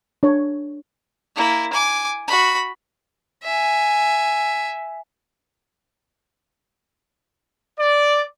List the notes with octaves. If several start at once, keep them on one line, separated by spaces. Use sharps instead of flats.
D4 C#5
A#3 E4
G#5 D6
F#4 B5
E5 G#5
D5